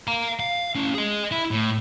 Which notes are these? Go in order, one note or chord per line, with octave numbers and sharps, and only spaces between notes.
F5 A#5
F5
C#4 E4
G#4 D#5
E4
A2